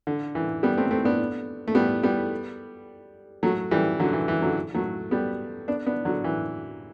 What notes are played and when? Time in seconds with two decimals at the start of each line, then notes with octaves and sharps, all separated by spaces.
0.07 D3
0.35 E3
0.63 G3 B3
0.78 A3 C4
0.91 A3 C4
1.05 B3 D4
1.68 A3
1.75 G3 B3
2.03 G3 B3
3.43 F#3 A3
3.71 E3 G3
3.99 D3 F#3
4.13 E3
4.28 E3
4.42 D3 F#3
4.75 F#3 A3
5.11 G3 B3
5.68 B3 D4
5.86 B3 D4
6.05 D3 F#3
6.24 E3